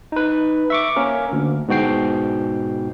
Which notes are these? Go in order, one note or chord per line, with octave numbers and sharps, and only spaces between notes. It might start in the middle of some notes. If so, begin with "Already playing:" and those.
D#4 B4
E5 C#6 D6
A#3 C#4 A#4
D2
G#2 B2 F#4 G5 C7